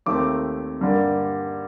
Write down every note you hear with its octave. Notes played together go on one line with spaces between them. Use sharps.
D#2 D#3 A3 C4 D6
G2 D3 G3 A#3